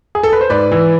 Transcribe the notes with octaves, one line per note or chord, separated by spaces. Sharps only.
G#4
A4
B4
C5
G#2 B4 D5
E3